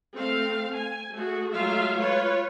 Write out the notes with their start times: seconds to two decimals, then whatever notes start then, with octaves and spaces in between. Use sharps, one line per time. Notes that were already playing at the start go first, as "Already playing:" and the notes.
0.14 A3 C4 F5
0.76 G#5
1.14 A3 F#4 G#4
1.53 F#3 G#3 A3 F4 E5 F5
1.99 F4 B4 C#5